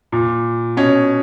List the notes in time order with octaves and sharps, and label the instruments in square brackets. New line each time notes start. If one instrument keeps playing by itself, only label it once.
[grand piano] A#2
B2 C#4